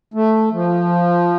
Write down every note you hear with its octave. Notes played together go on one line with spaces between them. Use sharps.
A3
F3